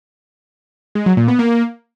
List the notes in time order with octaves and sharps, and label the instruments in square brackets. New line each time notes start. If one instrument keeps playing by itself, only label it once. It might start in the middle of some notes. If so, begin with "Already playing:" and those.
[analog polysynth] G#3
F#3
A#2
B3
A#3